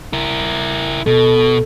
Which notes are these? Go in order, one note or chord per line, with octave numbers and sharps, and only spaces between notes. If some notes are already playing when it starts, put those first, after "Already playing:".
E4 A#4
B2 A4